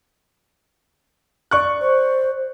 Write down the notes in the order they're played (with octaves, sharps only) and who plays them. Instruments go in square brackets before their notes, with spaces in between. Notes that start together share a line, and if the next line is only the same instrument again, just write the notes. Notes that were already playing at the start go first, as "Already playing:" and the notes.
[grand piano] D5 C#6 F#6
[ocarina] C5